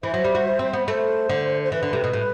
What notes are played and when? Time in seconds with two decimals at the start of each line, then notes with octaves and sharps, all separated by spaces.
0.03 E3 C5 E5
0.14 F#3
0.24 G3
0.35 F#4
0.59 C4
0.73 B3
0.88 A3 C5
1.29 D3
1.62 C5
1.71 E3 B4
1.83 D3
1.93 C3
2.04 B2
2.13 A2